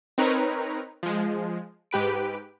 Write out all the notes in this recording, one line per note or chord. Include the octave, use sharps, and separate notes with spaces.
C4 D#4 A#4 B4 C#5 A#5
F3 G#3
G#2 G4 B4 D7